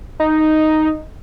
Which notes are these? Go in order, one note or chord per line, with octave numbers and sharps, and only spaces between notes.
D#4